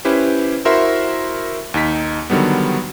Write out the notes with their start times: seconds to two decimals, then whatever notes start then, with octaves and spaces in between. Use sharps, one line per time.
0.05 C#4 E4 G4 B4 C5
0.65 E4 F#4 A#4 C5 E5 C6
1.74 D#2 D#4 B6
2.30 D3 D#3 F#3 G3 B3